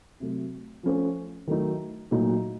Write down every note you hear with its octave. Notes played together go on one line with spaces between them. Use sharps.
C3 F#3 A3
F3 A3 C#4 A4 C5
D#3 F#3 A3 D#4
A#2 F#3 A3 D#4